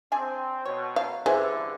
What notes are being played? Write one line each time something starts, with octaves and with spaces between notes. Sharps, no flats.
C4 D4 G#4 G#5
B2 C#5
F#3 F5
G2 D3 E3 G#4 B4 C5 E5 G#5